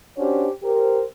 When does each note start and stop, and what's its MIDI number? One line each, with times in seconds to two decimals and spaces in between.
0.17 0.47 61
0.17 0.47 62
0.17 0.47 66
0.17 0.47 67
0.17 0.47 72
0.17 0.47 73
0.62 1.01 67
0.62 1.01 70
0.62 1.01 72